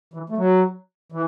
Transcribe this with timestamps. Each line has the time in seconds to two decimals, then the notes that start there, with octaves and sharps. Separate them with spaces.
0.14 E3
0.30 A3
0.38 F#3
1.12 E3